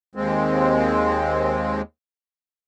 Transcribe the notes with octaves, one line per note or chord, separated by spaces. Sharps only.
D#2 G#3 C4